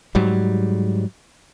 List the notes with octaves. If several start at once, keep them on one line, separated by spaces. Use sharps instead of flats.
G#2 F#3 G3